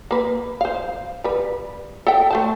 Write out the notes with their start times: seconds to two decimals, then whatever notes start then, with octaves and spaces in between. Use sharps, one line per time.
0.11 A#3 B4
0.61 C5 F5
1.24 G3 B4
2.07 A4 E5 G5
2.30 A3 C5 A5